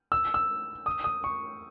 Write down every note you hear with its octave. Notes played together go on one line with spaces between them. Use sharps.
E6
E6
D#6
D#6
C#6